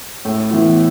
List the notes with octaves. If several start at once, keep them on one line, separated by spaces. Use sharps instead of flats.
A2
E3 B3 E4